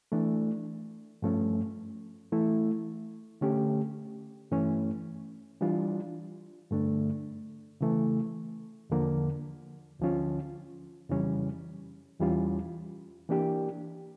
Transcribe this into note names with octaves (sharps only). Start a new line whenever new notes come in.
E3 A3 D4
G2 F3 A3 C#4
E3 A3 E4
D3 A3 C#4 G4
G2 E3 A3 C#4
E3 G3 D4 F4
G2 D3 A3 D4
C#3 E3 A3
E2 D3 F3 A#3
D2 D3 F3 C#4 F4
F2 C#3 E3 G3 C#4
E2 E3 G3 C#4 F4
E3 A#3 D4 G4